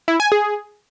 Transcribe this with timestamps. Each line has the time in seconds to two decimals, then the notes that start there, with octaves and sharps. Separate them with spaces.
0.08 E4
0.20 G#5
0.32 G#4